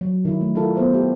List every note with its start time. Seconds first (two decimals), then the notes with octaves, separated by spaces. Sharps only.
0.01 F#3
0.25 D#3 E4
0.41 A3
0.55 E4 F4 A4 A#4 D5
0.75 B3 C5 E5
0.94 G4